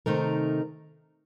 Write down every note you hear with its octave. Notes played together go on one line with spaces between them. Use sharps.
C3 D#3 A3 D#4 A#4